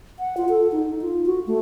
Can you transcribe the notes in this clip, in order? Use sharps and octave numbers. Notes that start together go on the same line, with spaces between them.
F#5
F4
A4
D#4
F4
F#4
A3